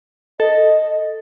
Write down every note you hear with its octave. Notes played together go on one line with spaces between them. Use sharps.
A4 D#5